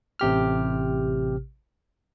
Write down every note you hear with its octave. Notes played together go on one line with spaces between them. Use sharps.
A1 C3 G4 F6